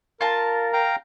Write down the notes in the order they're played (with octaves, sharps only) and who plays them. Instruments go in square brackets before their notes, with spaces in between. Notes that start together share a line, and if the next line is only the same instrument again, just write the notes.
[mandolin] F4 A5 [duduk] A#4
[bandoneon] F5 G5 A#5